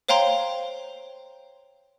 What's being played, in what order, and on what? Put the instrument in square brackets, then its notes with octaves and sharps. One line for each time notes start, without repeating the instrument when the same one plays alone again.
[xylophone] C5 C#5 F5 G5 A#5 C6